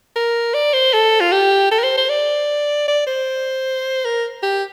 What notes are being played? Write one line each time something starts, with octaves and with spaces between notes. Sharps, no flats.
A#4
D5
C5
A4
F4
G4
A4
A#4
C5
C5
D5
D5
C5
A#4
G4